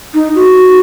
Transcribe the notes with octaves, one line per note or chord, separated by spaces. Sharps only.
D#4
F#4